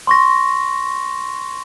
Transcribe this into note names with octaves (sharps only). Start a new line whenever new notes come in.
C6 C#6 A#6